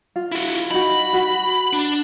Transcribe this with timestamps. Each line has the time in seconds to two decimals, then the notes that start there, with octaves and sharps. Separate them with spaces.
0.16 F4
0.32 E4 F#4
0.71 D#4 F#4 B5
1.13 F#4
1.73 D4